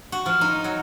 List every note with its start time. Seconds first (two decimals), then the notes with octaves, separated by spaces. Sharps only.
0.12 F#4
0.26 F3
0.41 D#4
0.64 F#3